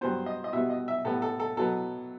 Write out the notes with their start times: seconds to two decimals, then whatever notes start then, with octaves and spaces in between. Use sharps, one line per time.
0.01 G2 F#3 B3 C5
0.26 D#5
0.44 D#5
0.53 B2 G3 B3 E5
0.70 D#5
0.88 E5
1.05 A2 G3 B3 A4
1.22 A4
1.40 A4
1.57 B2 F#3 B3 A4